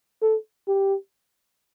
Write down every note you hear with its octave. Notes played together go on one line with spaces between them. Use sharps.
A4
G4